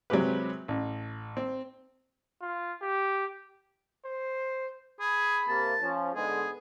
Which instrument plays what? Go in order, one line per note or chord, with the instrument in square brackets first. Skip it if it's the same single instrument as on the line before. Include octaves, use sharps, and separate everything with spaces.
[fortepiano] C3 F#3 G#3 C4 G4 B4
A1
C4
[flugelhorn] F4
G4
[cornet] C5
[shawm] G#4 [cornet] B5
[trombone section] C3 A#3 [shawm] A5
[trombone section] F3 C#4
[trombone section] G#2 D3 G#3 [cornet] B3 [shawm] G#4